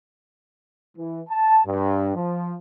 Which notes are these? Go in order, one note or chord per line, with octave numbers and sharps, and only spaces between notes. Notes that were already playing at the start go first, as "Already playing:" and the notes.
E3
A5
G2
F3